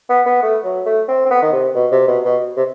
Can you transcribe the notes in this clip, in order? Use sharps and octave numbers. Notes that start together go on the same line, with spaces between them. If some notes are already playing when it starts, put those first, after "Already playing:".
B3
B3
A3
F#3
A3
C4
C4
B3
D#3
C3
B2
C3
B2
B2
C3